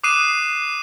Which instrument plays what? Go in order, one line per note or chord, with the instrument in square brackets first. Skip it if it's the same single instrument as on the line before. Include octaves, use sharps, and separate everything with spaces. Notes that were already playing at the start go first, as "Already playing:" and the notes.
[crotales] D6 D#6 F#6 C7 D#7 E7